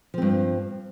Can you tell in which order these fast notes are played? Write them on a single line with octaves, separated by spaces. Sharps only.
F3 C4 G2